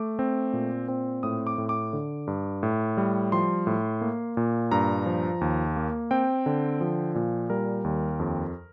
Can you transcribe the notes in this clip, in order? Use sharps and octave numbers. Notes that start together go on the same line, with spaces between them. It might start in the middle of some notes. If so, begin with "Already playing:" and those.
Already playing: A3 D6
C4
A#2
C4
A2 D#6
D6
A2
D6
D3
G2
A2
G3
F3 C6
A2
A#3
A#2
G2 A#5
F3
D#2
A#3
C4 G5
D3
F3
A#2
G3 A#4
D#2
F2